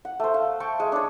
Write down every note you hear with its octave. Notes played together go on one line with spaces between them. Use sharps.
F#5
A3 C5
F5
G5 A5 C#6
G#3
D4 C#5